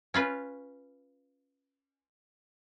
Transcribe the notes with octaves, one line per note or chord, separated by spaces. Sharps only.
C#4 F4 B4